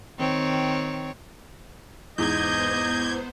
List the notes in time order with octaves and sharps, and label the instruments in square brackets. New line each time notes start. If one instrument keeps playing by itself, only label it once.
[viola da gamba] D#3 C4 C#5
[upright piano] E2 G#2 [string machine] B3 C5 [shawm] D#5 [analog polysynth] G6 G#6